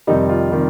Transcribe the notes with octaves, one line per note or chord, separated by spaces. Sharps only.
F2 C3 D#3 G3 D#4
F4
C3 D#3 G3